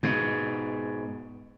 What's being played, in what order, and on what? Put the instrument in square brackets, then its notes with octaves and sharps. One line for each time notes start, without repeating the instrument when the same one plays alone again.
[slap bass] G#2 B2